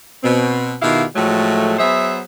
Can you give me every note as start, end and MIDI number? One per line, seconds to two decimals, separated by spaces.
0.23 0.74 47
0.23 0.74 60
0.81 1.04 47
0.81 1.04 51
0.81 1.04 64
0.81 1.04 65
0.81 1.04 67
0.81 1.04 77
1.15 1.75 45
1.15 1.75 53
1.15 1.75 54
1.15 1.75 56
1.15 1.75 57
1.78 2.20 54
1.78 2.20 59
1.78 2.20 68
1.78 2.20 72
1.78 2.20 76